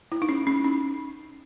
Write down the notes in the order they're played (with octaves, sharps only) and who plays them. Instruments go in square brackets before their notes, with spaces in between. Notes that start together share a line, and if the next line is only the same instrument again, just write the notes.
[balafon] E4
D#4
C#4
C#4
C#4